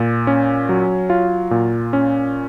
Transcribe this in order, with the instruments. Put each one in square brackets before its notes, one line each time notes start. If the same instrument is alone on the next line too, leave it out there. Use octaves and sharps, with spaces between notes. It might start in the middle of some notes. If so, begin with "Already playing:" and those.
Already playing: [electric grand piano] A#2
C#4
F#3
F4
A#2
C#4